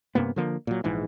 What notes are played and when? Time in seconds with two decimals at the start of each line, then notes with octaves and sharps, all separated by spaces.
0.15 G2 C3 A#3 B3
0.36 D3 F3 A#3
0.67 A#2 F#3
0.84 A#1 G#2 E3